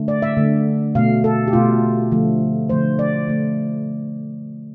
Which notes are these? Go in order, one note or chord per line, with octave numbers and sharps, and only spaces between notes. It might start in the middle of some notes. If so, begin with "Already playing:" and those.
Already playing: D3 A3
D5
E5
D3 A3
B2 A3 F5
A4
G4
B2 A3 F4
D3 F3 A3
D3 F3 A3 C5
D5
D3 A3